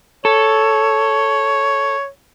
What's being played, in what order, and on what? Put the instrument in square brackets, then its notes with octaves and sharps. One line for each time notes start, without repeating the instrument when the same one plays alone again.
[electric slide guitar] A4 [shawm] C#5